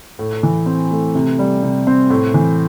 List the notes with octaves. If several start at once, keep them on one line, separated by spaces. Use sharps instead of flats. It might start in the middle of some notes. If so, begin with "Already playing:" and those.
A2
E3
C4
A3
C3
G3
C3
C4
A2
E3